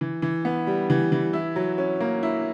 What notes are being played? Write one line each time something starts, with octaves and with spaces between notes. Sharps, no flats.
E3
E3
B3
G3
E3
E3
E4
F#3
C#4
A#3
E4